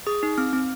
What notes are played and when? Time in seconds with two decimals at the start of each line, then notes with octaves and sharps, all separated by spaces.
0.07 G#4 D#6
0.23 D#4
0.38 C4 F6
0.53 C4